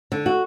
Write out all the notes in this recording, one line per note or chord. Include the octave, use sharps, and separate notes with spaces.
D3
F#4